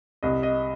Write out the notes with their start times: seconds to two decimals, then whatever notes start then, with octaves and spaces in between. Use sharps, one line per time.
0.23 C2 D#5
0.43 D#5